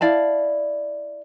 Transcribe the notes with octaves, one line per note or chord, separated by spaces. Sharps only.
E4 D5 F5 A5